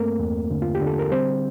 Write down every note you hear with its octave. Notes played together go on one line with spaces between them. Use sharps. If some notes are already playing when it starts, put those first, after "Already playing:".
Already playing: G2 A3 A#3 C4 A#4
E2
D3
F4
G4
D3
A4
A#4
G3 C4 C5